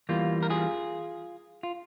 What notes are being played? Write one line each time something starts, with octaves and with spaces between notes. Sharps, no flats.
E2 E3 G3 A#3 F4
A#4
F4 G#4
F4